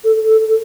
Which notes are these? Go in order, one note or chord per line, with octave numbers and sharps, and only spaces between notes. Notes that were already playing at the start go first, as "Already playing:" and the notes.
A4
A4